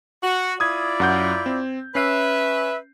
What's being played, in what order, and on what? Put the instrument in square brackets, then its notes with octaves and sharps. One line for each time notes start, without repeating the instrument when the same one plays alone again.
[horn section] F#4
[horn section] E4 F4 D5 [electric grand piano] D#6 G#6
[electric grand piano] F#2 F#5 G6
C4
[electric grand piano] C#4 C7 [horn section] B4 E5